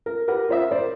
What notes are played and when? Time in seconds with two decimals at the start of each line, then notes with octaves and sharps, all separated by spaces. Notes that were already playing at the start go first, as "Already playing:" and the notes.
0.06 A#4
0.28 G4 A#4 B4 F#5
0.49 F4 C5 E5
0.71 A#4 C5 D5